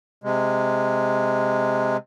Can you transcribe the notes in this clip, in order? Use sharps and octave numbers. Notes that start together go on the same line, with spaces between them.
C3 G#3